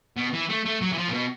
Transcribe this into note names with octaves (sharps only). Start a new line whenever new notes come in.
B2
E3
A3
A3
F#3
E3
F3
A#2
B2